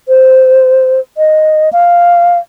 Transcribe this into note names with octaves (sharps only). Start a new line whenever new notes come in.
C5
D#5
F5